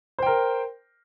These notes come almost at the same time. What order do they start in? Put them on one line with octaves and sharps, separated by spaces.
C5 G5 A#4